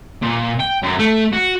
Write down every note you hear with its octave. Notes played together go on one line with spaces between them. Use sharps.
A#2
G5
F#2
A3
F#4